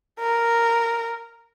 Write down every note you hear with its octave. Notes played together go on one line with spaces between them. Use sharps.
A#4